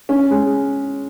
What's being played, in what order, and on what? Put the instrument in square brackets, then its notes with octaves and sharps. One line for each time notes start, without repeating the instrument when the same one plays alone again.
[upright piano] C#4
G#3